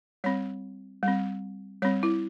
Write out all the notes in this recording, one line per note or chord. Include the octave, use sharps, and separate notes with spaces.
G3 C4 C#5
G3 C4
G3 C4 C#5
E4